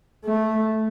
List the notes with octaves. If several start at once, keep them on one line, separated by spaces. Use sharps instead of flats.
A3